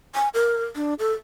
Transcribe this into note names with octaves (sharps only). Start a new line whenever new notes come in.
G#5
A#4
D4
A4